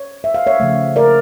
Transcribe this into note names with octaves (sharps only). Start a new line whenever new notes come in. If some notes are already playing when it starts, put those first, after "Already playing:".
Already playing: C#5
E5
F5
C#5 E5
C#3 F3 A3
A#4 D5